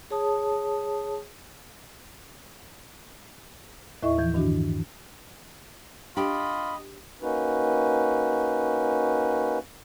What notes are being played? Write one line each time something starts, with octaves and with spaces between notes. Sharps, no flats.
G#4 C#5 A5 D#6
D#2 A2 E4 D#5 E5 C#6
E3 F3 G6 G#6
G2 D#3 D4 F#4
D4 F4 G4 D#5 B5
A#3 C#4 D#4 F#4 B4